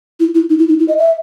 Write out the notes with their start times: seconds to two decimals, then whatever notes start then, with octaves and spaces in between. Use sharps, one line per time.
0.20 E4
0.35 E4
0.49 D#4
0.59 E4
0.69 D#4
0.79 E4
0.88 D#5
0.98 E5